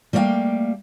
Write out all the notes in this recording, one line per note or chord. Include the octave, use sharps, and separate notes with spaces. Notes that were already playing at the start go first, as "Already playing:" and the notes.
G3 A3 A#3 D5 F5 G5